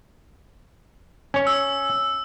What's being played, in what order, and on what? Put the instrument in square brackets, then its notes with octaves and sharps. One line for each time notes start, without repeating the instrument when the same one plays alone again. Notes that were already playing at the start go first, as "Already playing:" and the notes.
[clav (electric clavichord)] C#4 C#5
[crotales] E6